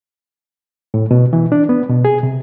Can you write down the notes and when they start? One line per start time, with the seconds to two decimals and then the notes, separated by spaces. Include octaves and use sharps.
0.94 A2
1.11 B2
1.33 E3
1.52 D4
1.69 B3
1.90 B2
2.05 G#4
2.23 C3